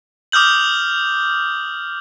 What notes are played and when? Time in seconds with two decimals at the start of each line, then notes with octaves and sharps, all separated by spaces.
0.32 D6 D#6 F6 G6 F#7